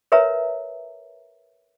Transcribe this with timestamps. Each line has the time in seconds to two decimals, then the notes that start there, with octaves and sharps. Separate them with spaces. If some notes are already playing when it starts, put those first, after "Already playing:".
0.12 A#4 B4 C#5 E5 A#5